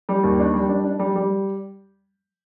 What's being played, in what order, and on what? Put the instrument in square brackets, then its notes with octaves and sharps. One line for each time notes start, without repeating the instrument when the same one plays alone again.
[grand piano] G3
D#2
D4
G3
D4
D4
G3
G3